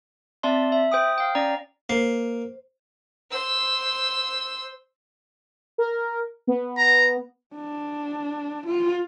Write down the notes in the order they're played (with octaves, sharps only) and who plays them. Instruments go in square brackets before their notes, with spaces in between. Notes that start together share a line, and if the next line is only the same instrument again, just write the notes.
[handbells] C4 D5 E5 A5 C6
E5
C5 G5 D#6
F5 G5
C#4 D5 A#5
[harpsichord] A#3 [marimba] C5
[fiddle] C5 E6
[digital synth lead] A#4
B3
[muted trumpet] A#5
[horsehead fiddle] D4
F4